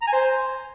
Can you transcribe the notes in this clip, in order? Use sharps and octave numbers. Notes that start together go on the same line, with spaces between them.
A#5
G#5
C5